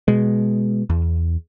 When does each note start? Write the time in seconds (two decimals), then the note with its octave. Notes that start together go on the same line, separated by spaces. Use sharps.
0.08 B2 G#3
0.90 E2